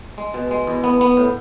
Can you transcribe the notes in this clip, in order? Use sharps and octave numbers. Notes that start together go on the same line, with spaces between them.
G#3
B2
G#3
E2
B3
B3
A2